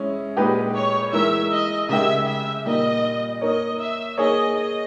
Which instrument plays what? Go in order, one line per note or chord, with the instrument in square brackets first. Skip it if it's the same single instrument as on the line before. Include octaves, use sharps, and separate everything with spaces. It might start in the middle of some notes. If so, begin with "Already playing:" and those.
Already playing: [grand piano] G#3 C#4 E4
A#2 G#3 D#4 G4 B4
[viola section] C#5
[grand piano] E3 G#3 D#4 A#4 [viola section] E5
[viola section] D#5
[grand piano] C#3 G#3 D#4 G4 A#4 [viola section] E5
[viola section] E5
[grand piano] A#2 G3 A#3 D#4 [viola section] D#5
[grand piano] A#3 D#4 A#4 C#5 [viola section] D#5
[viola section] E5
[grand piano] A#3 D#4 G#4 C#5 [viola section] D#5
[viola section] D#5